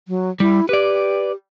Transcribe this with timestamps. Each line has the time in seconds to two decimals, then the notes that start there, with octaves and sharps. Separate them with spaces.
0.08 F#3
0.40 G3 E4
0.69 G4 B4 D5